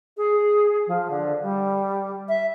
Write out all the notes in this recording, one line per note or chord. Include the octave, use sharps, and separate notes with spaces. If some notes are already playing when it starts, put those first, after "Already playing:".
G#4
F3
D3
G3
E5